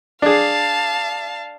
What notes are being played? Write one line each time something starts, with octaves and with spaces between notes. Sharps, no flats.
D4 G#4 F5 A5